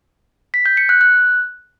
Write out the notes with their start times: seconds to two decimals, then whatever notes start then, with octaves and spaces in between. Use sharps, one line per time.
0.54 B6
0.66 G6
0.77 C#7
0.89 F#6
1.01 F#6